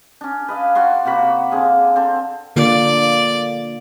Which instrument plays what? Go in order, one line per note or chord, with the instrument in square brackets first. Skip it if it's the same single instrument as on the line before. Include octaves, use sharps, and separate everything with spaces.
[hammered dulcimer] C#4 D4
B4 D#5 F5
F#4 C#5 D5 C6
C3 A#3 F#4 B5
D3 C4 G#4 F5
C4 A4
[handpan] D3 A#3 F4 [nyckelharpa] D5